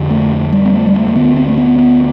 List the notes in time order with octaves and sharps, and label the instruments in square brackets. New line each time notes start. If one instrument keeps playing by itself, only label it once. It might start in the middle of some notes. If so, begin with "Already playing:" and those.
Already playing: [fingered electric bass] F2 D3
A3
G3
B3
A3
G3
A3
A3
D2 D3 B3
C4
A3
B3
B3